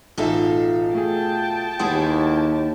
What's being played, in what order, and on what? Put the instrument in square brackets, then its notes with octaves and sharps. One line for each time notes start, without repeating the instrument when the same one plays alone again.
[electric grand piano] A1 D#4 E5 [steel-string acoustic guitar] B2 F4 A4
[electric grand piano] A3 G#4 [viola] G5 A5
[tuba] D#2 [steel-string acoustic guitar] B3 E4 G#4 [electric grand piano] F#5 C6 D#6